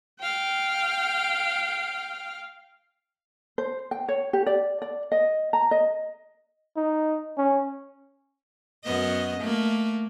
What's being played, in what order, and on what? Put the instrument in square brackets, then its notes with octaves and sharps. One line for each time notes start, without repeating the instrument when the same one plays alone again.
[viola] F5 G5
[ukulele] C5
G5
C#5
G4
D5
D5
D#5
A#5
D#5
[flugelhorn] D#4
C#4
[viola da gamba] F#2 B3 D#5
A3 A#3